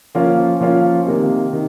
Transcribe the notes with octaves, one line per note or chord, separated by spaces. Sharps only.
F3 A#3 C#4 F4
F3 A#3 C#4 F4
C3 D#3 A#3
C3 D#3